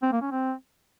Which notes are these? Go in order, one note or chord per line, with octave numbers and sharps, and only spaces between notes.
C4
A#3
C#4
C4